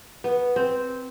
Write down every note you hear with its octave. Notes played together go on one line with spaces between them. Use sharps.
B3
C4